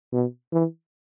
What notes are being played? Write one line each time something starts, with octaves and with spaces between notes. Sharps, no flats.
B2
E3